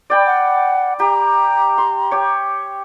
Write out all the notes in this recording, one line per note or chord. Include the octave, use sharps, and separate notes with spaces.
D5 G5 B5
F#5
G4 A#5
C6
G4 C#5